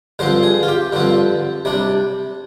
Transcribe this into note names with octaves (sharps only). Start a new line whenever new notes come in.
G2 D3 F3 C4 C5
G#4
F4
G4
G2 D3 F3 C4
C3 G3 D4